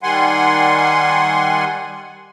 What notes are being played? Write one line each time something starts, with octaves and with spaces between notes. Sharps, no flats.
D#3 G3 F#5 G#5 C6